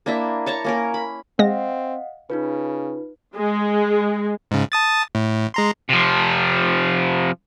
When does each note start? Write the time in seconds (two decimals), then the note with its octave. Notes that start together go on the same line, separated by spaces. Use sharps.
0.06 A#3 D4 E4 E5
0.46 C#5 A5 A#5 C#6
0.64 A#3 C#4 A#4
0.94 B5
1.39 G#3 C4 D#5 F5 F#5 A#6
2.30 C#3 D#4 F4 B4
3.36 G#3
4.51 G#2 C#3
4.72 A5 D#6 A6
5.15 A2
5.54 G#3 A#5 C6
5.89 C3 F3